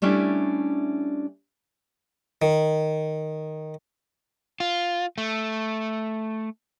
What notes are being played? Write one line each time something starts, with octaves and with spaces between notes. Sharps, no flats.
G3 A3 C#4 D4 E4
D#3
F4
A3